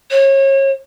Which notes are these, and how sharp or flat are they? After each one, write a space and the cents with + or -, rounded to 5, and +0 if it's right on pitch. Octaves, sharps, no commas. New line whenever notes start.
C#5 -30